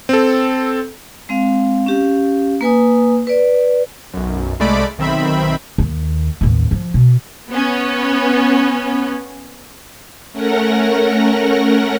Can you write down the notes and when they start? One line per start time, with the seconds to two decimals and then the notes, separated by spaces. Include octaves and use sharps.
0.09 C4 A4
1.29 G#3 C4 F5
1.86 C#4 G4 F5
2.61 A#3 B4 G#5 D#6
3.27 B4 D5
4.13 B1 F#2
4.59 C2 G#3 A3 D5 B5 D7
4.98 B1 D#3 C4 E5 B5
5.78 D#2
6.41 A1 D#2
6.71 F3
6.94 B2
7.50 B3 C#4
10.32 A3 C#4 A#4 F#5 A#6